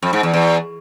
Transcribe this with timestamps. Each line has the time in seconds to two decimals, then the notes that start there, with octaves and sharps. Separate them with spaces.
0.03 F2
0.13 G#2
0.23 E2
0.34 E2